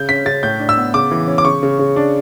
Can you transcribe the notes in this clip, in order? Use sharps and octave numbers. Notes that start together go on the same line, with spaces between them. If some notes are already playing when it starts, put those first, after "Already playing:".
Already playing: C#3 G6
C#4 B6
C#3 A6
A2 G6
D4
E6
B3
C#3 D6
E3
C#4
D6
C#3 C#6
C#3
C#3
D4